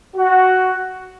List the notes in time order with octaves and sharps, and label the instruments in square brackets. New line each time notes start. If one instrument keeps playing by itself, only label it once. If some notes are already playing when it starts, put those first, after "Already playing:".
[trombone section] F#4